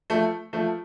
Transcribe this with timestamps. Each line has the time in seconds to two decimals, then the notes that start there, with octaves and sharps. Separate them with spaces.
0.10 F3 A3
0.53 F3 A3